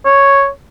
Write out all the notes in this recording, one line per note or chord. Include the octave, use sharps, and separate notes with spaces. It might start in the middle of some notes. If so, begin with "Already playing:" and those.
C#5